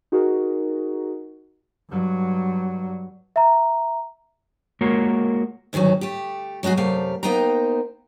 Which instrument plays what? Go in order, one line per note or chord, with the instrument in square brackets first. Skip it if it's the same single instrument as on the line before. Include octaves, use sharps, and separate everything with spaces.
[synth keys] D#4 F#4 G#4 A#4
[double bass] G2 F#3
[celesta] E5 A#5
[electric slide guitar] G#3 A#3 F#4 A#4 C#5
[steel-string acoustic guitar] D2 G2 D#3 F#3 C#4
A3 G4
F#3 G#3 A3 F#4 G#4
F#2 C3 A3 G4 F5
A#3 B3 D#4 C5 G5 A#5